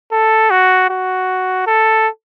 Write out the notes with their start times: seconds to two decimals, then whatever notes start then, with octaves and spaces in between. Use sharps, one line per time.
0.12 A4
0.51 F#4
0.90 F#4
1.67 A4